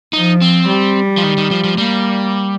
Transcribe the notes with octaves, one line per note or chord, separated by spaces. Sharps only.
F3 D#4
C4
G3
F3
D#3
D#3
F3
F3
G3 A#3